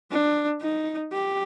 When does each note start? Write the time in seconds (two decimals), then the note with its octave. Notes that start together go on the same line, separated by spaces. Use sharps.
0.11 D4
0.61 D#4
1.13 G4